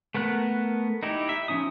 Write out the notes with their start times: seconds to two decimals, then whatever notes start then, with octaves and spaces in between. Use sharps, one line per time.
0.15 A3 B3 A#4 F#6
1.03 D#4 E4 G4
1.29 E5
1.48 F3 C#4 D#4 D#6